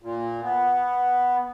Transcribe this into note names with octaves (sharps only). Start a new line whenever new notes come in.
A#2
B3